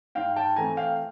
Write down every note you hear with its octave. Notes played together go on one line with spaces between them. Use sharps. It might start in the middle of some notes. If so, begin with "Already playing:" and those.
G#2 F5 G5
G5 A5
E3 A3 C4 G#5 A#5
F5 G5